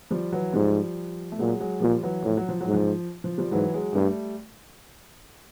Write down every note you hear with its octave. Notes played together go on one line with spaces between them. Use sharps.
F3 G3
E3 F#3
G#2 F3 G3
A3
A#2 F#3 G#3
F#3 G#3
A#2 F3 G3
E3 F#3
A2 F3
F#3
F3
F#3
G#2
F3
F3
F3 G3
G#2 E3 F#3
F#3 G#3
G2 G3 A3